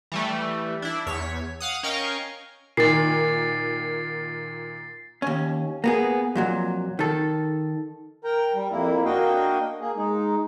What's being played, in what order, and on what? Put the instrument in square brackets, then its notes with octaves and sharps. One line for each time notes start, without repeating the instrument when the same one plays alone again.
[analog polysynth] E3 G3 A3
D4 E4
E2 C#5 B6
F5 F#5 D#6
C#4 A#4 D#5 F5 G5 C#6
[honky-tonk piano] A#2 D#3 [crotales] A6 C7
[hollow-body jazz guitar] D#2 C#4
A#3 B3 G#4
F2 A#2 F#3
D#3 A4
[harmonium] A#4 G5 A#5
G3
F2 A#3 E4
A#3 D4 F#4 D#5 F5 G5
A#3 G#4
G#3 D#4